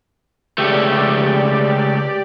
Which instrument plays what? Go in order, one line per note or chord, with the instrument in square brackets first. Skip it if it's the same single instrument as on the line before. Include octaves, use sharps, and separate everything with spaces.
[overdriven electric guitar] C#2 A3 [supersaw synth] G4 D5